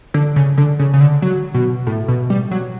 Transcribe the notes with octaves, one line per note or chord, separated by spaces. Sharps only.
D3
C#3
D3
C#3
C#3
D3
F#3
B2
A2
B2
G3
F#3